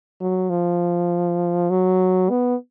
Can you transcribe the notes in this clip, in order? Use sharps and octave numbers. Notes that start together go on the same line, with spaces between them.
F#3
F3
F#3
B3